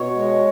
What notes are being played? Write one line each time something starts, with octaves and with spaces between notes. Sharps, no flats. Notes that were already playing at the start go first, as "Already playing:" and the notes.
Already playing: B2 C#5
G#3